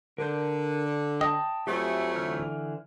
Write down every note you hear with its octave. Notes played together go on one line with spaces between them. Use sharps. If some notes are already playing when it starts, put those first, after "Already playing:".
D3 A#4 G6
D#5 G5 A5
F2 F#3 A3 G4 G#4
D3 E3 F6